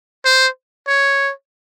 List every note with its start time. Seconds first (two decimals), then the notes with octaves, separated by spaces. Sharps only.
0.25 C5
0.87 C#5